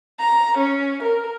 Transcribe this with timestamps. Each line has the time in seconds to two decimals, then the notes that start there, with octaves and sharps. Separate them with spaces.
0.19 A#5
0.58 C#4
1.02 A#4